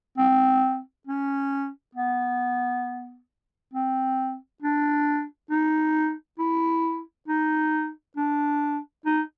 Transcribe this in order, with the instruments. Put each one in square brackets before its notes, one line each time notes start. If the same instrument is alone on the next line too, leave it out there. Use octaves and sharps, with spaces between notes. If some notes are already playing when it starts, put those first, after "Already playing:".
[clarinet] C4
C#4
B3
C4
D4
D#4
E4
D#4
D4
D#4